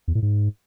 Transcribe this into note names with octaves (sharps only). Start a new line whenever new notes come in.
E2
A2
G#2